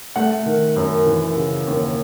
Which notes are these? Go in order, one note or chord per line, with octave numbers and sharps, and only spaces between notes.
A3 F#5
D#3
F#2
E3
C#3
D#2